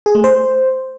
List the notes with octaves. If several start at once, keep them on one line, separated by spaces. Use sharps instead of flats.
G#4
A3
C5